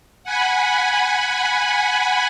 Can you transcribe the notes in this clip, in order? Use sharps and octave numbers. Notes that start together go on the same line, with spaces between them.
F#5 G#5 B5